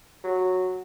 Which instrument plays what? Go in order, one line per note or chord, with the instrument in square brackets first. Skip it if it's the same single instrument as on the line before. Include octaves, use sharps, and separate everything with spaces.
[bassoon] F#3